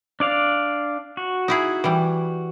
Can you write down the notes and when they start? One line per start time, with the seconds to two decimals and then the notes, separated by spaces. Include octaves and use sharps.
0.20 D4 D5 F5
1.17 F#4
1.48 D#4 E4 G#4
1.84 E3 G3